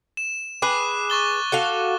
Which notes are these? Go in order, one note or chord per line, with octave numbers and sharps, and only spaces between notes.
E7
G#4 B4 D6 F#6
C#6 A6 G7
F#4 A4 F5